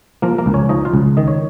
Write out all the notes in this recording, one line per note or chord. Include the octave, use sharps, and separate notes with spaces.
F3 A#3 A#4
A#3 A#4
C#2
C#4 C#5
F3 D#4 D#5
F4 F5
C#2
D#3 D#5
C#5